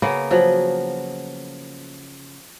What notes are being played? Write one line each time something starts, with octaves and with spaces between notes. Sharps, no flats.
C#3 A#3 B3
F3 F#3